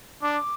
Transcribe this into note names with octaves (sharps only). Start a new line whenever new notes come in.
D4 D6